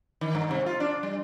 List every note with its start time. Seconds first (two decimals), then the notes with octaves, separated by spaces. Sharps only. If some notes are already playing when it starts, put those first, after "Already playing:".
0.21 D#3
0.35 G2
0.51 C3
0.66 F4
0.80 D4
1.03 G3